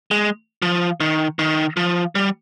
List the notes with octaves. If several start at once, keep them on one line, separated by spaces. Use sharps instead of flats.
G#3
F3
D#3
D#3
F3
G3